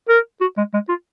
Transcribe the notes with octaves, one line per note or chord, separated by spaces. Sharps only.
A#4
F#4
G#3
G#3
F4